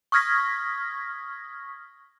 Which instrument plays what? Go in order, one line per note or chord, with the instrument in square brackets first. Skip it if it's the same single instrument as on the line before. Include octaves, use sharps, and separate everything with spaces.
[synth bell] C#6 D#6 F6 G#6 A#6 B6